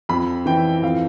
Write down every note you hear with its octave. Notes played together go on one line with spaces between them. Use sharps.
F2 B5
E3 G5
F2 F5